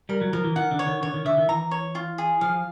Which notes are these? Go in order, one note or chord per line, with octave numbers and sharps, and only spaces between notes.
G3 A#4
F#3
F3 A#4
E3
D#3 F#5
D3
C#5
D#3
D3 C#5
D#3
D3 E5
D#3
E3 A#5
C#5
F4
G#4
F3 F5